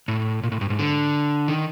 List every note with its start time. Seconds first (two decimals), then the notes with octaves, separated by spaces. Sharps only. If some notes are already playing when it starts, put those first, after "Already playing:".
0.08 A2
0.43 A#2
0.52 A2
0.61 G2
0.70 G#2
0.79 D3
1.48 D#3